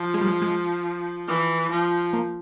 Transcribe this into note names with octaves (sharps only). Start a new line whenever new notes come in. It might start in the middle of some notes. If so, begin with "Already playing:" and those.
Already playing: F3
G#3
G3
G#3
G#3
E3
F3
A#3